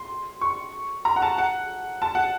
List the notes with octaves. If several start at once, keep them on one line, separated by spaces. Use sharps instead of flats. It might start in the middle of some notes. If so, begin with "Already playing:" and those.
Already playing: C6
C#6
A#5
F#5
A5
F#5
A5
F#5